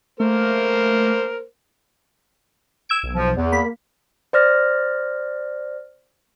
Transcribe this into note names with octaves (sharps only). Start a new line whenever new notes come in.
A3 A#3 A#4 C5
E6 G#6 D7
B1
F3
E2
A#3 B5
C5 D5 F6 A#6